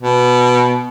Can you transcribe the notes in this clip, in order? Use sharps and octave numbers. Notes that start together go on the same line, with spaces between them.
B2